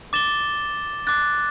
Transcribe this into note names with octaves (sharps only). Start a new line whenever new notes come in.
D6 A6 E7 G7
D6 F#6 A6